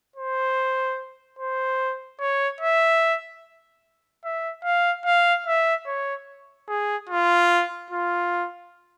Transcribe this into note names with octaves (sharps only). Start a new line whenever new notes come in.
C5
C5
C#5
E5
E5
F5
F5
E5
C#5
G#4
F4
F4